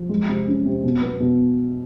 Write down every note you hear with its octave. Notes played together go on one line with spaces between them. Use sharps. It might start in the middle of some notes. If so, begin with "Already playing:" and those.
Already playing: F3
G#3
C3
C#4
C3
B2
B3
B2